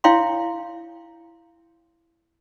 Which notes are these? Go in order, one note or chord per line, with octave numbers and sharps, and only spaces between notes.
E4 C#5 F5 G5 C6